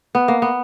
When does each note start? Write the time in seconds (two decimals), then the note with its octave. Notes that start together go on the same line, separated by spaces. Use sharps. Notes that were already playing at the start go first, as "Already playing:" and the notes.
0.15 B3
0.28 A#3
0.42 B3